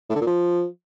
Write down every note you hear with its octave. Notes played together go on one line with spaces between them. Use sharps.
A2
D3
A#2
F3